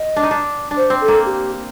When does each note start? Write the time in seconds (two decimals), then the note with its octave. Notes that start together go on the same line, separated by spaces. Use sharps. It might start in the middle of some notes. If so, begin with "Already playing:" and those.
Already playing: D#5
0.16 D4
0.23 D#4
0.31 D4
0.71 D4
0.77 C5
0.90 C4
1.01 A4
1.08 A#3
1.26 G4